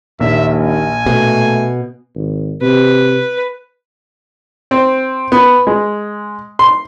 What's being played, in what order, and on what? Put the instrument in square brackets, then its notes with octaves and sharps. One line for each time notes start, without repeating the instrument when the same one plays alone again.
[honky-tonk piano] A#1 [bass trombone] D#2 [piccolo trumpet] E5
[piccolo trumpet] G#5
[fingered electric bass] B2 [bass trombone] A3
[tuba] G#1
[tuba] C3 [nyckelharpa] B4
[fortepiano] C4
B3
G#3
C6